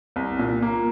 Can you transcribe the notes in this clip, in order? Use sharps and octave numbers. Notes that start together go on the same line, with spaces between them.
C2
A#2
A#3